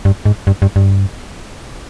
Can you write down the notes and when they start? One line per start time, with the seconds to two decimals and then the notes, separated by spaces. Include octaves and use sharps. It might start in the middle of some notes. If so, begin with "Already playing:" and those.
0.05 G2
0.25 G#2
0.47 G2
0.62 G2
0.76 G2